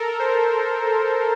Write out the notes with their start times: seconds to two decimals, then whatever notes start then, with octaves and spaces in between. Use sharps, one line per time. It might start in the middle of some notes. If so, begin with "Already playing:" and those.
Already playing: A4 A#4
0.19 C5